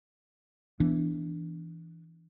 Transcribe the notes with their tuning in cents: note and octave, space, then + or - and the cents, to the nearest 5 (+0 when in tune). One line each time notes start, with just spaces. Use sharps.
E3 +0 B3 +0 D4 +0